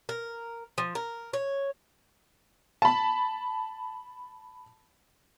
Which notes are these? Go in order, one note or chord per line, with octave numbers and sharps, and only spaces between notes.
A#4
F3
A#4
C#5
A5 B5